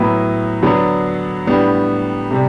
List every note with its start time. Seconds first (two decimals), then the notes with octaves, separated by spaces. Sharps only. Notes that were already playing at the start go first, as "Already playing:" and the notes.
Already playing: A2 F#3 B3 E4 B4
0.63 D3 F#3 B3 D4
1.46 A2 G3 B3 D4
2.31 C3 G3